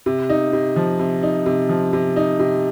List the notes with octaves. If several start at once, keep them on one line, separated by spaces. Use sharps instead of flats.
C3
D#4
C3
F3
C3
D#4
C3
F3
C3
D#4
C3